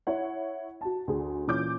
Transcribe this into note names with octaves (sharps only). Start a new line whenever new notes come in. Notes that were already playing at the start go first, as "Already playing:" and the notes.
E4 C#5 F#5
F#4 A5
D2 G#4
A#2 E3 C#4 D6 G6